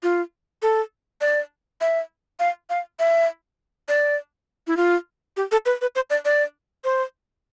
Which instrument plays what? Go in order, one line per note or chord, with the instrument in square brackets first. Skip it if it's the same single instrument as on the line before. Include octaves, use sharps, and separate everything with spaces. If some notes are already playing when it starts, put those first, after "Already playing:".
[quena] F4
A4
D5
E5
F5
F5
E5
D5
E4
F4
G4
A4
B4
B4
C5
D5
D5
C5